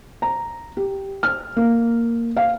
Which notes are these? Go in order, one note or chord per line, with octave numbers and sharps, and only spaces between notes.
A#5
G4
F6
A#3
F5